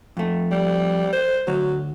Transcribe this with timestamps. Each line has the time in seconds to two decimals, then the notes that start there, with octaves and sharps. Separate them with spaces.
0.17 F2 A3
0.51 G3
1.13 C5
1.47 D2 F#3